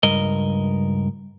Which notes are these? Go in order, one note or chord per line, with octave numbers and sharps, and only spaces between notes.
C#2 G2 A#4 D#5